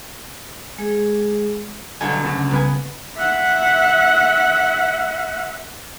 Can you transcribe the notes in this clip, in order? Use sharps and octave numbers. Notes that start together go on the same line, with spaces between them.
G#3 G#4
G2 B2 D3 F#3 G#5
D2 C#3 A6
C2 B3 B4 G#5
E5 F#5